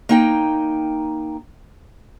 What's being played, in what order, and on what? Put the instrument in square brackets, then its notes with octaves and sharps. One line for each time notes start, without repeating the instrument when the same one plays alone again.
[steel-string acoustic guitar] A#3 D#4 G5